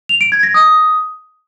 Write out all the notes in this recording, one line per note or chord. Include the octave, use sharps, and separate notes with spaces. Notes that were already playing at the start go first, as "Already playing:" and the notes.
F7
D7
G#6
A#6
D#6